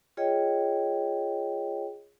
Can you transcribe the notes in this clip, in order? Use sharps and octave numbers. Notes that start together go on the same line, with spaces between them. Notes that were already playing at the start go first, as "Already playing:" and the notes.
F4 G#4 C#5 D#5 G5